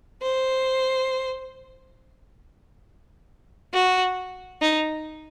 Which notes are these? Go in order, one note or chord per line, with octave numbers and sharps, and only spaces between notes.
C5
F#4
D#4